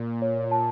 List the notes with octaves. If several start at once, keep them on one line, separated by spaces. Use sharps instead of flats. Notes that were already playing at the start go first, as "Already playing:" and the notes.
Already playing: A#2
C#5
A5